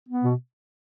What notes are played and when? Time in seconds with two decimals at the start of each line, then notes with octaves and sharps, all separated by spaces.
0.08 B3
0.23 B2